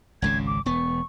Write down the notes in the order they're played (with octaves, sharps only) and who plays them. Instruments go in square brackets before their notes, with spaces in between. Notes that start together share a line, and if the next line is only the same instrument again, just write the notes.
[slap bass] G#1 C#2 C#3 [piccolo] G#6
[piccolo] D6
[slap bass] E1 B3 [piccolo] C#6